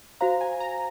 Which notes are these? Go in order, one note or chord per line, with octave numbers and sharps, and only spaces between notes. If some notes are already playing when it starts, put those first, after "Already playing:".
F#4 C5 F5 A#5
G#5
A#5